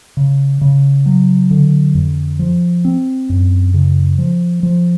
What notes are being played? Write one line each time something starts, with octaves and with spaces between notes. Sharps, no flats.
C#3
C#3
F#3
D3
F2
F3
C4
F#2
C#3
F3
F3